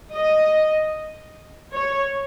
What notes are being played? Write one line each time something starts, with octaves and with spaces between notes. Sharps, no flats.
D#5
C#5